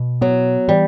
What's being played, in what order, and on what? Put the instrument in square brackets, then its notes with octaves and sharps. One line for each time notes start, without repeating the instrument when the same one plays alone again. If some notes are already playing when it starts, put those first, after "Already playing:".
Already playing: [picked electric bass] B2
[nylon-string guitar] F#3 [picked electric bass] B3
[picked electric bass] E3 [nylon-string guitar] G3